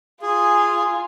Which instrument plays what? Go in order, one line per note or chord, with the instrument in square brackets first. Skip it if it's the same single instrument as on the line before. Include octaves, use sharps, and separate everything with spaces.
[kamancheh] F4 G#5 [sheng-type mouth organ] G#4